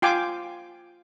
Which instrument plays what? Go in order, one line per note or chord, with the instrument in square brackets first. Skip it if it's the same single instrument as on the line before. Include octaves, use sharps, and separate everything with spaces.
[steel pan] F4 G5 G#5 D6